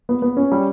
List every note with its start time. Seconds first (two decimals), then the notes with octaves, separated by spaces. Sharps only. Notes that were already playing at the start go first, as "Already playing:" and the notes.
0.09 B3
0.22 B3
0.37 C#4
0.52 G3